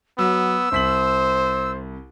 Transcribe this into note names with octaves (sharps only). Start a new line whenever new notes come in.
F#3 B3 E6
C2 C5 B6 F#7